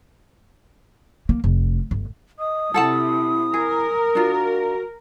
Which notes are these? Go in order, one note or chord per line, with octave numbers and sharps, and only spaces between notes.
A#3
F1
G1
D#5 D#6
C3 E4 A4 F#5 A5
G#4 A#4
D4 F4 F#4